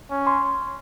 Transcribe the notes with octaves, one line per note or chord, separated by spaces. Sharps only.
C#4
C6